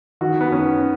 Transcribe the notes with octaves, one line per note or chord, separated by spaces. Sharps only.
D#3 F#4
B3
D#3 C#4